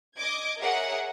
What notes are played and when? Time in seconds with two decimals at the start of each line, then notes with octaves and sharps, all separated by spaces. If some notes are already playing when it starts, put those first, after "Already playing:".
0.18 D#5 D6 G#6
0.61 G#4 A#4 C#5 E5 F#5